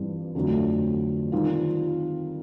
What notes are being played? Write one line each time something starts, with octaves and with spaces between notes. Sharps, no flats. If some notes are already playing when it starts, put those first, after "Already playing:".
Already playing: G2 E3 G3 C4 F4
F2 D3 F#3 A3
D#3 G3 C4 F4